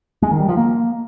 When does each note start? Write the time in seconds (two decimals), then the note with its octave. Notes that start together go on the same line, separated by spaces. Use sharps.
0.22 G#3
0.31 D#3
0.40 G3
0.48 F3
0.57 A#3